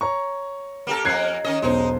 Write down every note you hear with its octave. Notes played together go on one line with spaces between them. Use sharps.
C#5 A#5 C#6
A#3 G4 A4
F2 A#3 F#6 G#6 C7
D#3 C#4 D#5
E1 B1 G#3 D#4 C5